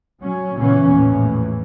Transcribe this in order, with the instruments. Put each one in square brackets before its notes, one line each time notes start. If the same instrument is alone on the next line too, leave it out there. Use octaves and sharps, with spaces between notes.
[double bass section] F#3 C#4
A#2 C#3 E3 B3 C#4
A#1 E2 A2 E3